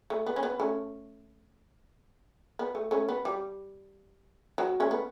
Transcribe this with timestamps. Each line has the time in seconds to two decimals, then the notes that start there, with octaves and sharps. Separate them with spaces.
0.10 A3
0.26 B3
0.36 C#4
0.43 B3
0.60 A3 C#4
2.59 B3
2.75 A3
2.91 A3 C#4
3.09 B3
3.25 G3
4.58 F#3
4.80 A3 C#4
4.91 B3